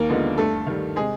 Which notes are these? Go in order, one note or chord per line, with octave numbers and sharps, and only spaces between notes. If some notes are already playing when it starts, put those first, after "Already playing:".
Already playing: D#2 A#3 A#4
D3 F3 G#3 B3
G2 A3 A4
D#3 G3
C3 G#3 G#4